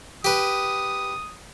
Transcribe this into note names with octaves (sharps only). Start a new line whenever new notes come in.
G4 B4 D#6